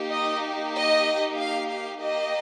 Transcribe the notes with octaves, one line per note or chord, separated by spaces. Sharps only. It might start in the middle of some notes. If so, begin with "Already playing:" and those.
Already playing: A#3 D#4 G4
D#5
D#5
F5
F5
A#3 G4 D#5